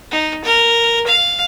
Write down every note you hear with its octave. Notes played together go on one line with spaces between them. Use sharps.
D#4
A#4
F5